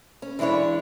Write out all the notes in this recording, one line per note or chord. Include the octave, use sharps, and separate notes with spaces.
C#4
E3 G#3 D4 E4 C#5